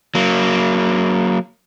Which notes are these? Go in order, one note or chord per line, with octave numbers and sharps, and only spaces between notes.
F#3 A#3